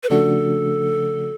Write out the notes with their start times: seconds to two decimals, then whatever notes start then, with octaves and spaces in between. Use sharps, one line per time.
0.03 B4
0.10 C#3 F3 A3 D4 F#4 A4